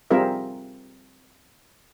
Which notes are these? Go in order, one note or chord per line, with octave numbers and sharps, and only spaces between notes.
G3 C4 F4 G#4 A#4 E5